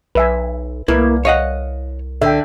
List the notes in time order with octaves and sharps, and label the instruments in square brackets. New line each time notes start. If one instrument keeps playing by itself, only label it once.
[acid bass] B1 [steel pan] B4 E5 G#5
[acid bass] C2 [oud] A#3 [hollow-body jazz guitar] E4 [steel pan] B4
[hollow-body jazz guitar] C#5 D#5 F#5 [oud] F5
[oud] D3 [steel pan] E5 G5